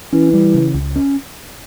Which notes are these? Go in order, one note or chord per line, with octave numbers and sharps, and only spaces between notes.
E3 C#4
G3
C#3
C#2
C#4